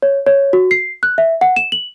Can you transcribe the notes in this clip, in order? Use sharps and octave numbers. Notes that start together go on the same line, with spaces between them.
C#5
C#5
F#4
C7
F#6
E5
F#5
E7
F#7